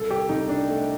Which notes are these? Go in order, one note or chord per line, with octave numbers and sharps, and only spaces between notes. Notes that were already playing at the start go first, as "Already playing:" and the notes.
Already playing: C2 A4
G4
C2 D#4
D4
A3